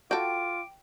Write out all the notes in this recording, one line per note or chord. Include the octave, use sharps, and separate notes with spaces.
F4 F#4 A4 G5 D6